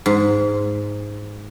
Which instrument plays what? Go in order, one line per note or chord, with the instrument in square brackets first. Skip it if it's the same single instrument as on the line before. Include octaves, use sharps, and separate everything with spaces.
[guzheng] G#2